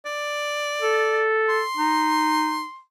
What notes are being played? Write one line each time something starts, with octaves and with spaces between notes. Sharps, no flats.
D5
A4
C6
D#4